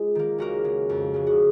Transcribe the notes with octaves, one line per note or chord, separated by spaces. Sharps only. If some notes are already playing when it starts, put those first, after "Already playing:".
Already playing: G#3 F4
D#3 A#3
C#2 F#4 A#4
C#3 G#3
F2
C#3 G#3
F#4